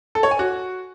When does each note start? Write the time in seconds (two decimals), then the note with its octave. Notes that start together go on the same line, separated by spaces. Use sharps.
0.15 A4
0.23 C#5
0.31 G#5
0.39 F#4